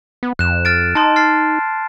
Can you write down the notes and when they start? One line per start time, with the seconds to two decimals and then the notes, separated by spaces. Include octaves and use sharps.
0.23 B3
0.39 F2 F#6 E7
0.65 F6 A6 D7
0.95 D#4 A5 C6
1.16 F6 A6 C7